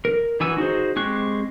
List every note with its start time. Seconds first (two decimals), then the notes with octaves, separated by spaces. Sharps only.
0.05 A#4
0.40 E3 D#4 F#4 G#5 E6
0.57 D#4 F#4 G#4 C5
0.96 G#3 C4 G4 C#6 F#6